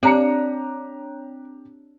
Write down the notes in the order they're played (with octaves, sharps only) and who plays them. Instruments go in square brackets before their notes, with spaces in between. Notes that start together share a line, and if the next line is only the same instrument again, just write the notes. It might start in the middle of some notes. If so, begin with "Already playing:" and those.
[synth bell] C4 C#5 F#6 [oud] D4 [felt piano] G4 A#5 C#7